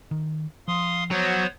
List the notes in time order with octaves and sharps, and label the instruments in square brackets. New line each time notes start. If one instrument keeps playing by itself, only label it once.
[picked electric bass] D#3
[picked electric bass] F3 [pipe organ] F5 C6 D#6
[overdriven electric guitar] F#3 [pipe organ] B3 C5 C#5